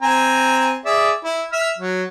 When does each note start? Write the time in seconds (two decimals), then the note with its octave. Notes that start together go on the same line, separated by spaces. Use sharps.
0.02 C4 G#5 A#5
0.85 G#4 D5 E5
1.24 E4
1.52 E5 F6
1.78 F#3